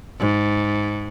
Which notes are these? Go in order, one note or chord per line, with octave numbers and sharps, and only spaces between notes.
G#2